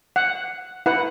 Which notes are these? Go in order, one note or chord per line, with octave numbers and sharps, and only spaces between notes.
F#5
E4 B4 F#5